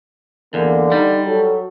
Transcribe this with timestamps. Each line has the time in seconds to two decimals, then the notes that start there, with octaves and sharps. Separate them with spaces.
0.54 E2 D3 A#3
0.92 G3 D#4
1.26 F#3 A4